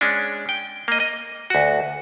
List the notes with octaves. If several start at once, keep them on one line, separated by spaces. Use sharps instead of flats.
G#3 C#4 D4
G5
A#3 D#5
D#5
D2 F#4